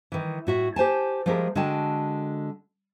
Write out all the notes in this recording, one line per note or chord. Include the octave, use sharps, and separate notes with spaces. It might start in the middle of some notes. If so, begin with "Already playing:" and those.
D#3 E3
A2 F#4 E5
G4 C5 G#5 A5
F3 G#3 A3 G4 G#4 A#4
D3 G#3 F#4 G5 A5